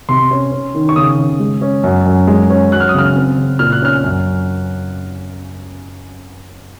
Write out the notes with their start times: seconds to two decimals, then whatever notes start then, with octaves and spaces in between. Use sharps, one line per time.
0.09 C3 C6
0.31 C#4
0.52 C#4
0.75 D#3
0.89 C#6
0.96 C#3 D#6
1.19 C#3
1.40 G#3
1.61 C#4
1.84 F#2
2.06 F#2
2.27 G#3
2.50 C#4
2.72 F#3 F#6
2.80 F6
2.89 D#6
2.94 C#3 F6
3.16 C4
3.37 C#3
3.59 A#2 F6
3.72 F#6
3.82 C#4 F6
4.04 F#2